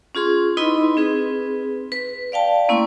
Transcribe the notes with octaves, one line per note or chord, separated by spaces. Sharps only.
C#4 F4 G#4 C6
D#4 E4 B4 D#5 B5 C6
C4 G#4 B4
B4
D5 F5 G5 A5
A3 A#3 C#4 E4 C6